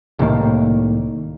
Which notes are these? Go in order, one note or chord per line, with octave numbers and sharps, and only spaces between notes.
C2 A2 D#3 A#3